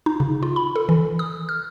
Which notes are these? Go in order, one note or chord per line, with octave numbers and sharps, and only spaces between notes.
D#4
C#3
F4
B5
A4
E3
D#6
F6